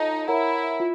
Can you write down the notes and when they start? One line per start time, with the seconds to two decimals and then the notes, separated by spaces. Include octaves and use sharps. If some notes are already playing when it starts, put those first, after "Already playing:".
Already playing: D#4 F4 A4 C#5 F5 A5
0.28 E4 A#4 C#5 F#5 A#5
0.80 F4